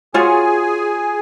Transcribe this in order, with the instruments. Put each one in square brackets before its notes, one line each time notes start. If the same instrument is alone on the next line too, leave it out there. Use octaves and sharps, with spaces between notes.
[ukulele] F4 F#4 C#5 [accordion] G#4 G#5